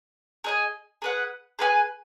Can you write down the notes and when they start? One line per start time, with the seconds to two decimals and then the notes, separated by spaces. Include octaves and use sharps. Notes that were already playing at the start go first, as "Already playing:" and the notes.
0.44 G#4 D#5 G#5
1.02 G#4 B4 F#5
1.59 G#4 B4 F5 G#5